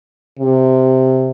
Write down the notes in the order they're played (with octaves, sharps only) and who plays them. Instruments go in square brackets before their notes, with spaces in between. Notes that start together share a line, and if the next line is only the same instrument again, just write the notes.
[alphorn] C3